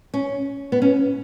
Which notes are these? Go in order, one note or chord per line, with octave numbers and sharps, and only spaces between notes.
C#4
B3
C#4